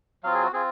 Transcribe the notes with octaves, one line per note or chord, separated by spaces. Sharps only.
F#3 C4 F4 F5
G#4
F#4
C4 F4 G#4